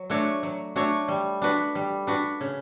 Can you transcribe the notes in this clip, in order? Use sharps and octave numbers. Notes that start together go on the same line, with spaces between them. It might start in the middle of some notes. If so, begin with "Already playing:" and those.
Already playing: F#3
A3 D4 F#4 C#5
F#3
A3 D4 F#4 C#5
G3
D4 F#4 B4
G3
D4 F#4 B4
C#3